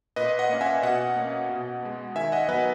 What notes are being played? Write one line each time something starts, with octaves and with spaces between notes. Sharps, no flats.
A#2 B4 D#5
D#5 F#5
A#3 C#4
E5 G#5
B2 D#5 F#5
A#3 C#4
B2
G#3 B3
D#3 E5 G#5
D#5 F#5
F#3 B3 B4 D#5